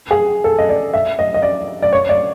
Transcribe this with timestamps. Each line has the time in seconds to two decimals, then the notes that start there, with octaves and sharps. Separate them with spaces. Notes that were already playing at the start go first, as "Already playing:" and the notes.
0.11 G#4
0.44 A4
0.58 D#5
0.69 D5
0.94 E5
1.19 D#5
1.34 D#5
1.42 D5
1.82 D5
1.93 C#5
2.09 D5